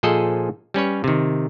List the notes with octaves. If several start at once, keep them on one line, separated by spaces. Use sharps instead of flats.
A#2 F3 G#4 A4 C5 D#5
G3 C#4 B4 C#5
C3 D#3